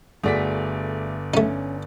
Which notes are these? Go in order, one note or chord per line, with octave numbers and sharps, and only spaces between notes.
G1 A3 F#4 G#4 D5 B6
A3 C#4 D#4